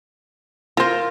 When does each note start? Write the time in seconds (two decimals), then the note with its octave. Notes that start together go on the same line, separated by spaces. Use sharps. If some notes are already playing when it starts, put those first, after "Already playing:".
0.77 C4 F4 A#4 C5